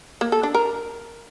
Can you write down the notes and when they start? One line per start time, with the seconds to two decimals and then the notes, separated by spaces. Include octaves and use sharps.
0.21 A#3
0.32 A4
0.43 D4
0.55 A#4